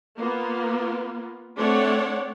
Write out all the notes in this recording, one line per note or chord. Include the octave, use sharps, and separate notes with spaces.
A#3 B3 F4
A3 C4 D4 C#5 D5 F#5